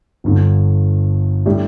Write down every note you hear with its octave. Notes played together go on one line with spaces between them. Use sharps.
G1 G2 D3
A2 G3 D4 G4